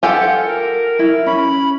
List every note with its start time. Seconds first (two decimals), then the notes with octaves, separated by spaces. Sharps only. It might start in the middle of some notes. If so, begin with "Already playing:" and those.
0.03 F4 G4 A4 F#5 G#5
0.46 A#4
0.99 E4
1.26 C#4 B5